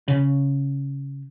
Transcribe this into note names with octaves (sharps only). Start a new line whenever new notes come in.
C#3